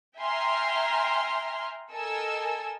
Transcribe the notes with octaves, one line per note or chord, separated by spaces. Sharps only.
E5 G5 G#5 A#5 C6 F6
A4 A#4 D#5 G#5 E6